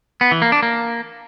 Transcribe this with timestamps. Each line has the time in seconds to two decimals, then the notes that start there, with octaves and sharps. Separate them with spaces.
0.21 B3
0.31 E3
0.42 A#3
0.52 D4
0.63 A#3